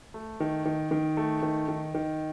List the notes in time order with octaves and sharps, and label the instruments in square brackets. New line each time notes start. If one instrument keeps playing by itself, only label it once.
[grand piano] A3
D#3
D#3
D#3
A3
D#3
D#3
D#3